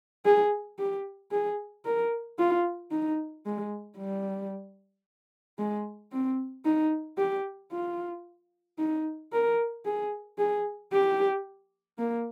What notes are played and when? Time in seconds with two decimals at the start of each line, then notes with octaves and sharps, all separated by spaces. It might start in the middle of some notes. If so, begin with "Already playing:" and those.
0.25 G#4
0.79 G4
1.31 G#4
1.85 A#4
2.39 F4
2.91 D#4
3.46 G#3
3.98 G3
5.59 G#3
6.12 C4
6.65 D#4
7.18 G4
7.72 F4
8.79 D#4
9.33 A#4
9.85 G#4
10.38 G#4
10.92 G4
11.98 A#3